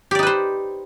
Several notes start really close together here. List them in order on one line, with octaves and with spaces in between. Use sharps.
G4 D5 D#4 B4 C5